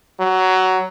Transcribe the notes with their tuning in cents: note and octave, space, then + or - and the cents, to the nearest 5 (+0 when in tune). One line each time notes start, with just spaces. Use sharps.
F#3 +15